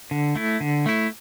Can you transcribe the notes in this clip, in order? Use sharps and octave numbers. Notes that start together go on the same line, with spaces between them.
D3
A3 E4
D3
A3 E4